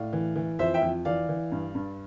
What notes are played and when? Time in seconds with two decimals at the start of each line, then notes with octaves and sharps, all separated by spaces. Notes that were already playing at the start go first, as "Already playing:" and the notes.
Already playing: A2 D5 F5
0.13 E3
0.36 E3
0.59 F2 C5 E5
0.74 E5 G5
0.82 F2
1.05 E3 D5 F5
1.29 E3
1.52 G2
1.75 G2